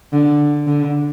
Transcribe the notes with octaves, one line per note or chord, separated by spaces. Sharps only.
D3
D3